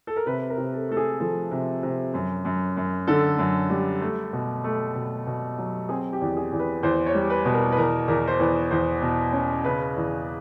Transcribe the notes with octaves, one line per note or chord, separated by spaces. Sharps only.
A4
A#4
C3 B4
A#4
C3
A4
A3 A4
G#4
F3 A4
C3
C3
F#2
F#2
F#2
D3 A4
F#2
G3
A3
B2
A3
B2
B2
F#3
C4 G#4
G4
E2
G#4
E2
B4
E2 C5
C#5
G3
B4
B2
A#4
B4
E2 A#4
E2 A#4
C5
E2 B4
E2 C5
B2
C#4
C#3 B4
E2